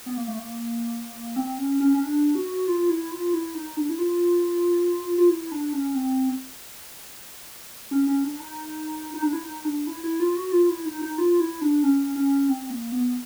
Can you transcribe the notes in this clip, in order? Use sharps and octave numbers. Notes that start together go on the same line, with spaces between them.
B3
A#3
A3
A#3
C4
C#4
C#4
C#4
D4
F#4
F4
E4
F4
E4
D#4
D4
E4
F4
F4
E4
D4
C#4
C4
C#4
C#4
D4
D#4
D#4
D4
E4
D#4
D4
E4
E4
F4
F#4
F4
E4
D#4
D#4
F4
E4
D4
C#4
C#4
C4
A#3
B3